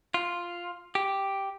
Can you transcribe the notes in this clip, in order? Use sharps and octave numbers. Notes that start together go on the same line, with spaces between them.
F4
G4